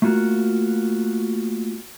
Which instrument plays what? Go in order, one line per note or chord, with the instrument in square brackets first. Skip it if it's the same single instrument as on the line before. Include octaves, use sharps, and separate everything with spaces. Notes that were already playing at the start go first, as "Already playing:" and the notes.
[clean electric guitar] A3 A#3 F4 F#4